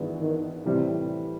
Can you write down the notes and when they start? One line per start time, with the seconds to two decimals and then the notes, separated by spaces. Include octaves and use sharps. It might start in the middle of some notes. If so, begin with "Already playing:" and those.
Already playing: G#1 G2 E3 G#3 B3
0.21 D#3
0.66 A2 C3 E3 G3